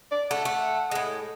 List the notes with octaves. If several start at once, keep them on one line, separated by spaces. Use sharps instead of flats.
D5
A3 F#5
A3
A2 G#3